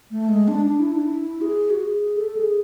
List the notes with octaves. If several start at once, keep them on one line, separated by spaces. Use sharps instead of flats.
A3
G#3
D4
D4
E4
D4
E4
G#4
F#4
G#4
A4
G#4